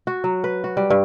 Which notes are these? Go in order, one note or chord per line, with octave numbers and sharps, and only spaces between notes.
F#4
F#3
B4
F#4
G3
G2